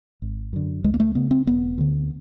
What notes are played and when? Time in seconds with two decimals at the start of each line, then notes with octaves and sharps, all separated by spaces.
0.22 G#1
0.53 F#2 D3
0.84 C#2 G#3
0.94 A#3
1.00 A3
1.15 C#3 B3
1.31 C4
1.47 E1 B3
1.78 D2 D3